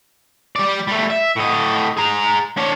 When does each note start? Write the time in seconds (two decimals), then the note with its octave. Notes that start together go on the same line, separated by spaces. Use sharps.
0.56 G3 D5
0.87 G3 A3
1.10 E5
1.36 A2 D#5
1.97 G#4 A#5
2.57 D4 C#5